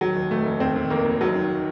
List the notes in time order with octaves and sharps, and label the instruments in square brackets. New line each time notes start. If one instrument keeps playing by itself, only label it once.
[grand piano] D#2 [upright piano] F#3
[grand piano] D#2
[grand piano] F1 [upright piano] A3
[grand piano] F1
[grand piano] D#2 [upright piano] C4
[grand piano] D#2
[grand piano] F1 [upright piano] A#3
[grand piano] F1
[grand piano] F1 [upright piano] F#3
[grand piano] D#3